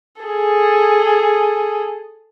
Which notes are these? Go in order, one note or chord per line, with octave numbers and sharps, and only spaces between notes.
G#4 A4